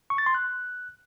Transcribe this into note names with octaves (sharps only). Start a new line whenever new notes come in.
C#6
A6
C6
F#6